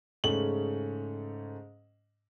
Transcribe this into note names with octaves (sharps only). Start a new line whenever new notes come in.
G#2 C#3 A3 C#4 F#7